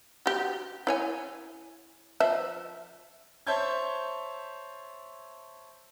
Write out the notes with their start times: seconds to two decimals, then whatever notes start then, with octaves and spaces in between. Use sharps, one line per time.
0.26 F#4 G4
0.87 E4 C#5 G#5
2.20 F3 E5
3.47 C5 C#5 E5 A5 G6 G#6